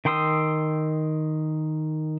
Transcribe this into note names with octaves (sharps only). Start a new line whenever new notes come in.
D#3 G5 C6 D#6 E6